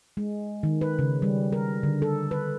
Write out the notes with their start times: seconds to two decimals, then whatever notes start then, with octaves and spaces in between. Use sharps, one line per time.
0.17 G#3
0.63 D#3
0.81 B4
0.99 C#3
1.22 G3
1.53 A#4
1.83 D3
2.02 A4
2.31 B4